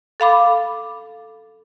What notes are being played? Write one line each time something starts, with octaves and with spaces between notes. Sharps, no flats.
A4 F5 B5 D6